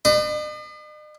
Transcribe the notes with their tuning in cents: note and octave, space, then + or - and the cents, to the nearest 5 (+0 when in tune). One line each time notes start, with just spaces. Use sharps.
B4 +40 D#5 -45